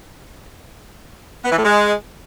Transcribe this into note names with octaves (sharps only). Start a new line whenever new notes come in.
B3
E3
A2
G#3